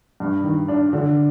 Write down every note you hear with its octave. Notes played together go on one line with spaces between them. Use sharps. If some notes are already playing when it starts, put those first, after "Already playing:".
G2
D#3
D4
D3